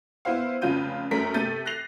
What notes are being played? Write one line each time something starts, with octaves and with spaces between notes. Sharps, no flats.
B3 E4 C5 F5
F1 C#3 F4 G6 D#7
F1 F#2 A3 A#4 A#5 B6
C3 A3 A4 G6 A6 D#7
F#6 A#6 C7 F7